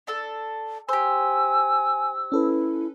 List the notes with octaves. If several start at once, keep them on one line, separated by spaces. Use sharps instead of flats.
D4 A4 E6
G4 C5 G#5 E6
C#4 E4 A4 B4